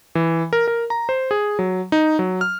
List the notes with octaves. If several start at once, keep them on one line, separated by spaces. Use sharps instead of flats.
E3
A#4
A#4
A#5
C5
G#4
F#3
D#4
F#3
F6